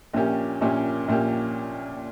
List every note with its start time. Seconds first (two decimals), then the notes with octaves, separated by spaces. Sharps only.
0.14 A#1 A#2 A#3 C#4 G4
0.61 A#1 A#2 A#3 C#4 G4
1.08 A#1 A#2 A#3 C#4 G4